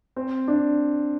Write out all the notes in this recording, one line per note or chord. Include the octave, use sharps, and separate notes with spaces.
C4
D4